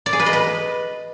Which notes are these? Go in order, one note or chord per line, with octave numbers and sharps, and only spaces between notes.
D5
G#4
B4
D#5
B4